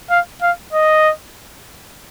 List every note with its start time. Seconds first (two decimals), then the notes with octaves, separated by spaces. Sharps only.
0.10 F5
0.42 F5
0.73 D#5